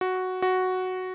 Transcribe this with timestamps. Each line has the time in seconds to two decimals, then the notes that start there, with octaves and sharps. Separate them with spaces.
0.01 F#4
0.42 F#4